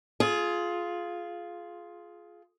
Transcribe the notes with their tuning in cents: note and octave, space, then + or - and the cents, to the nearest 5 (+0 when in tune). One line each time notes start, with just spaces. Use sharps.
F4 +0 G#4 +20